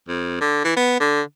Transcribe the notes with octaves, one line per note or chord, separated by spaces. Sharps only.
F2
D3
E3
B3
D3